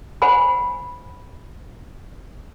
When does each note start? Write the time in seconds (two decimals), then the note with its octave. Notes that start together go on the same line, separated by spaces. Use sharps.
0.22 C5 F#5 G#5 B5